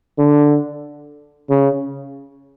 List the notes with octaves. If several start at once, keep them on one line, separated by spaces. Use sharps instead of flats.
D3
C#3